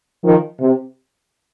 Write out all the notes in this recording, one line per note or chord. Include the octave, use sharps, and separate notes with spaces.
D#3 F3
C3